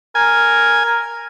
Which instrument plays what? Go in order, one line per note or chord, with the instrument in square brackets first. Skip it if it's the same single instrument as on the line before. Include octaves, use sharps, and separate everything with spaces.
[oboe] A#4 [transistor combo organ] G#5